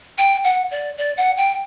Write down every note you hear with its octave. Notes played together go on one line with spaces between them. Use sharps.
G5
F#5
D5
D5
F#5
G5